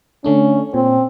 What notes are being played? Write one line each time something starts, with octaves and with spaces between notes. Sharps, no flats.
D3 A3 C#4 D4
A#2 C4